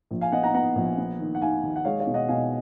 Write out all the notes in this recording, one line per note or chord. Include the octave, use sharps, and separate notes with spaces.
A#1
F5 G#5
B3 D#5 F#5
F#5 A#5
B3 F#5 A#5
A#1
B3
D#3
F#5
D#2 F5 G#5
D#2
F#5
G#3 C#5 F5
C#5 F5
B2
D#5 F#5
B2 F5 G#5